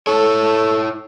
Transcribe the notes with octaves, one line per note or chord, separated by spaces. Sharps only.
E4 A4 C#5